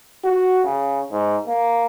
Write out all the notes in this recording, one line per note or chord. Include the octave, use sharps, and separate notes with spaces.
F#4
C#3
G#2
A#3